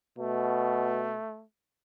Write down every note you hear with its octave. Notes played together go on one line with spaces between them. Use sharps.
B2 A3